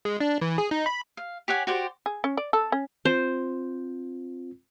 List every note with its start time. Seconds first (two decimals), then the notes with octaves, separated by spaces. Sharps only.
0.05 G#3
0.21 D4
0.41 E3
0.58 G#4
0.71 D#4
0.86 B5
1.17 F5
1.48 G4 C#5 F#5 G#5
1.67 F#4 G4 C5 D5
2.06 G#4
2.24 C#4
2.37 D5
2.53 A4
2.72 C#4
3.05 C4 F4 C5